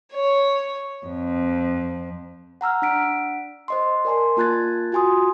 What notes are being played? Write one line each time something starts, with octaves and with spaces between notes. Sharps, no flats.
C#5
F2
F#5 A#5 E6 F6
D4 F#5 B6 D7
C5 D#5 C6
A#4 D5 G#5 A5 C6
A#3 F4 A5 F#6 G#6 A6
F4 F#4 G#5 C6 D#6